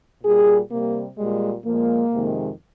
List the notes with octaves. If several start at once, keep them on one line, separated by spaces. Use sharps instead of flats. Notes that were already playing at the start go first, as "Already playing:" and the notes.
A#2 G3 G#4
C3 G3 A#3
A#2 G3 G#3
A#2 F3 G#3 A#3
F2 C3 D#3 G#3